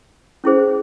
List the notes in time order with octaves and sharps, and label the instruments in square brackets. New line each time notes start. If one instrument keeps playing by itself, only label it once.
[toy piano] C#4 E4 G#4 C5